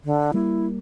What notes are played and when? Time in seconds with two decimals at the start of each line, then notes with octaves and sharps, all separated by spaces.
0.04 D3
0.34 G3 A#3 E4